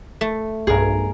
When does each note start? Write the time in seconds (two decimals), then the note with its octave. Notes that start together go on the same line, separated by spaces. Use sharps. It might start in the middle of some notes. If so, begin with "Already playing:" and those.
0.21 A3
0.67 B1 G2 G#4 A#4